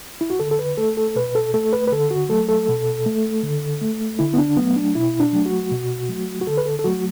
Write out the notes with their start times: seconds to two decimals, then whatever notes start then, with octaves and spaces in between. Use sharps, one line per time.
0.21 E4
0.30 F#4
0.40 D3 A4
0.51 A4
0.59 B4
0.77 A3 A4
0.97 A4
1.15 B2 B4
1.35 A4
1.54 A3 A4
1.73 B4
1.87 B4
1.92 D3 A4
2.11 F#4
2.29 F#3 A3 A4
2.49 A4
2.68 B2
3.06 A3
3.43 D3
3.81 A3
4.19 D3 E4
4.34 B3
4.38 D4
4.57 F#3 A3 B3
4.76 D4
4.95 B2 E4
5.20 D4
5.33 F#3 A3
5.46 F#4
5.72 B2
6.09 F#3 A3
6.41 F#4
6.47 D3 A4
6.57 B4
6.66 A4
6.79 A4
6.84 F#3 A3 F#4